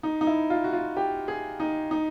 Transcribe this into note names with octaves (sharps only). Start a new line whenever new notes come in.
D#4
D#4
E4
F4
F#4
F4
G4
G#4
D#4
D#4